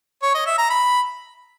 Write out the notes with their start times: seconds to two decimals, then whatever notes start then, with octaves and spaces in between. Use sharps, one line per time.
0.22 C#5
0.34 D#5
0.46 E5
0.58 A#5
0.70 B5